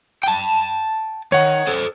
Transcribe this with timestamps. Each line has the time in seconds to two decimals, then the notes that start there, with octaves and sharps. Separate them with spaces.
0.23 G5 A5
1.32 D#3 C#5 F#5
1.67 A4 C5